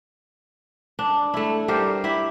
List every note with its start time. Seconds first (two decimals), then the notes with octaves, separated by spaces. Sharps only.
0.99 D4
1.34 A3 E4
1.68 G3 G4 A#4 C5
2.04 E4 G4 E5